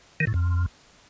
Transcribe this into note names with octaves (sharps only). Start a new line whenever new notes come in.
D#3
A2
F2